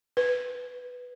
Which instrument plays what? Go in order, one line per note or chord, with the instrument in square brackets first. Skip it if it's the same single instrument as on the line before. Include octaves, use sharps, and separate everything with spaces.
[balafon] B4